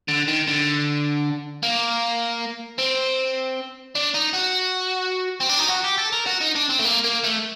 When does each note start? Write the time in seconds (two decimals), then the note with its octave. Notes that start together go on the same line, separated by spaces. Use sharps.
0.08 D3
0.28 D#3
0.47 D3
1.63 A#3
2.79 C4
3.95 D4
4.14 D#4
4.33 F#4
5.40 C4
5.49 D4
5.59 D#4
5.68 F#4
5.84 G4
5.98 A4
6.13 A#4
6.26 F#4
6.41 D#4
6.55 D4
6.70 C4
6.79 A3
6.85 A#3
7.04 A#3
7.24 A3